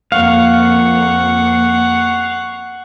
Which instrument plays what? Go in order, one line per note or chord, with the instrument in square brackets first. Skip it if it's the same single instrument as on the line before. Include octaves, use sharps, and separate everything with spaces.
[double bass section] F2 A#3 [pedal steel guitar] F5 [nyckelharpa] F#5 C#6